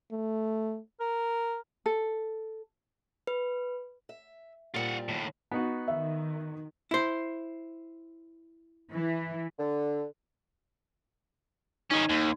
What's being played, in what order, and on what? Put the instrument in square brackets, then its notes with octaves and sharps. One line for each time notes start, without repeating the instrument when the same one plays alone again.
[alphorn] A3
[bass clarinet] A#4
[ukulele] A4
[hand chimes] B4
[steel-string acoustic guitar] E5
[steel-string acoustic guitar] A#2 G3 C4 [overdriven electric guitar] F4 F#5
[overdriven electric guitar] D#2 A2
[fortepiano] B3 D#4 F#4
[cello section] D#3 [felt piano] E5
[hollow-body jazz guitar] E4 C5
[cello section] E3
[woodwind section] D3
[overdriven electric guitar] D#3 C#4 [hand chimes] D#4 G#6
[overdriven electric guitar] D#2